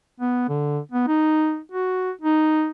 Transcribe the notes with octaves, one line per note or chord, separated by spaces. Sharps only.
B3
D3
B3
D#4
F#4
D#4